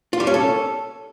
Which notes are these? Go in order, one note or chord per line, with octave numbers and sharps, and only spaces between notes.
F4
G3
C#4
A4